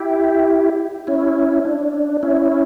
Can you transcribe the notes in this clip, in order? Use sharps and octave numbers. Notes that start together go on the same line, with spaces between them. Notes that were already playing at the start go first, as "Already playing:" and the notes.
Already playing: E4 G4
C#4 E4
D4
C#4 E4